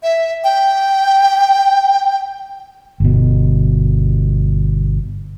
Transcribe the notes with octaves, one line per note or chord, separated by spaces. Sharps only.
E5
G5
G1 B2